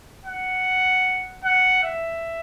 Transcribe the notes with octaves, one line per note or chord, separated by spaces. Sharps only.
F#5
F#5
E5